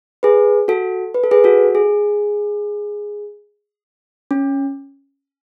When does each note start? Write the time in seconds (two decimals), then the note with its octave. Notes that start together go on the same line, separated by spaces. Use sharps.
0.23 G#4 B4
0.68 F#4 A4
1.14 B4
1.24 A4
1.31 G#4 B4
1.44 F#4 A4
1.75 G#4
4.31 C#4